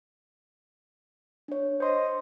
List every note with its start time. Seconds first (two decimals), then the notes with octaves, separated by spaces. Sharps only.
1.48 D4 C#5
1.80 C5 D#5 C6